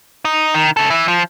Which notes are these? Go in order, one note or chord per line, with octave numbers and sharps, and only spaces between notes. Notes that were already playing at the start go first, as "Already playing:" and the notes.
D#4
D#3
C#3 A4
E3 E4
F3